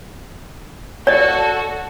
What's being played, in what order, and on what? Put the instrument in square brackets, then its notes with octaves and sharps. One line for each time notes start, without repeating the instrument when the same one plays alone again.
[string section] F#4 A4 [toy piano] D5 D#5